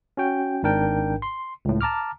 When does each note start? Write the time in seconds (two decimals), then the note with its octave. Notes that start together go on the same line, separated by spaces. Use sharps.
0.17 C#4 F#4 G5
0.63 G#1 G#2 D4 A#4 G5
1.22 C6
1.65 C#2 A2
1.81 A5 A#5 D6 F6